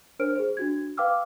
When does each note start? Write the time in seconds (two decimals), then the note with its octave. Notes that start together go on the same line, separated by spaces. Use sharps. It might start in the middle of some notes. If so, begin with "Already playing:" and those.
0.19 D4 A#4 C5 C#5 F6 D7
0.35 G#4 C5
0.57 D4 F#4 G#6
0.97 B4 F5 G5 D6 E6 F6